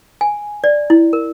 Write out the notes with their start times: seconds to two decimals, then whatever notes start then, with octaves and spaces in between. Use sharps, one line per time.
0.21 G#5
0.64 D5
0.90 E4
1.13 A#4